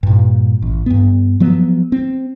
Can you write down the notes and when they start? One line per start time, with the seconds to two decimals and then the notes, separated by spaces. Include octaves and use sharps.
0.03 G2 A#2
0.62 A1
0.86 G2 B3
1.40 F3 F#3 B3
1.92 C4